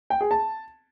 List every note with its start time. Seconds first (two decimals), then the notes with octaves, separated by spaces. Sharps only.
0.10 G5
0.21 G#4
0.31 A5